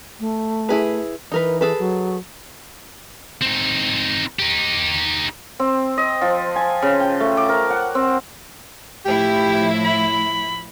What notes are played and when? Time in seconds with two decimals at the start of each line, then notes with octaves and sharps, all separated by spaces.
0.20 A3
0.69 E4 G#4 B4
1.32 E3 D#4 A#4 B4
1.61 G#4 A4 B4
1.79 F#3
3.42 C4 D#4
4.39 D#4 G4
5.59 C4
5.98 D#5
6.21 F3
6.56 G#5
6.82 C#3
7.00 G5
7.20 A3
7.37 D6
7.49 A#4
7.70 F#5
7.95 C4
9.05 A2 F3 E4 G4
9.85 B5